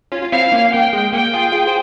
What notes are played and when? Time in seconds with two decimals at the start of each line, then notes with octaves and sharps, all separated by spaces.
0.12 C#4 F4
0.22 F4
0.32 C4 E4 F5
0.52 A#3 C#4
0.73 A#3 G5
0.93 G#3
1.13 A#3 G5
1.33 F4 G#4
1.53 F4 G#4
1.67 G#4 C5